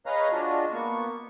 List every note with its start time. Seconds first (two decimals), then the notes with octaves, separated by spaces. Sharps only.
0.06 G#4 B4 C#5 D#5 F5 A#5
0.32 G#3 D4 F4 F#4
0.73 A#3 B3 C#6